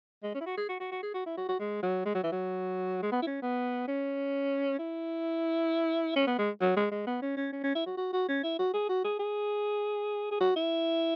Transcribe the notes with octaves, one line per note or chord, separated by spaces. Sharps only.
G#3
C#4
E4
F#4
G#4
F#4
F#4
F#4
G#4
F#4
E4
F#4
F#4
G#3
F#3
G#3
F#3
E3
F#3
G#3
B3
E4
C#4
B3
C#4
E4
C#4
B3
G#3
F#3
G#3
G#3
B3
C#4
C#4
C#4
C#4
E4
F#4
F#4
F#4
C#4
E4
F#4
G#4
F#4
G#4
G#4
G#4
F#4
E4